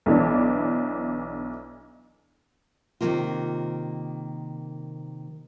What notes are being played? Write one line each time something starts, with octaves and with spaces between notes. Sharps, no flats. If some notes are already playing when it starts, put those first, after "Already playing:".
B1 E3 D4
C3 D#3 F3 F#3 A#3 F4